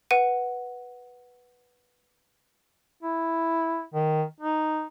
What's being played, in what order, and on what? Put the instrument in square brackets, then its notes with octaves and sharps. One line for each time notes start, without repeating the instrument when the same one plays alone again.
[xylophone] B4 F#5 D#7
[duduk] E4
D#3
D#4